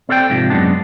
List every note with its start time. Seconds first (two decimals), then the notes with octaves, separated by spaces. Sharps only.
0.09 C4 A4 D5 F5 G5
0.30 G#2 C3 F3
0.50 F#2 G#3 B3 D4